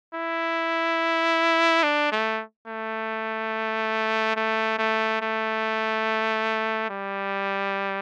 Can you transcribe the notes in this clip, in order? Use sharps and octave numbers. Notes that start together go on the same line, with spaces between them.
E4
D4
A3
A3
A3
A3
A3
G3